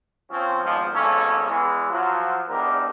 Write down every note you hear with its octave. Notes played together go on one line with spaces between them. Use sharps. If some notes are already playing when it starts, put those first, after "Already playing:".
F3 C4 C#4
G#1 E2 G#2 F3
G#1 E2 C#3 A#3 C#4 A4
E2 E3 G#3
F3 F#3
E2 G#2 D4 G4 A#4